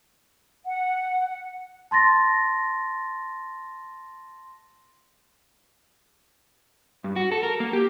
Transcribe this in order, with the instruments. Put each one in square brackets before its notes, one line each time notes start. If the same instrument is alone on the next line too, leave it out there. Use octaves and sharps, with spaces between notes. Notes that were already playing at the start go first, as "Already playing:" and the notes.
[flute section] F#5
[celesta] A5 C6 A6 A#6
[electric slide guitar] G2
F#4
A4
A#4
A#3
G4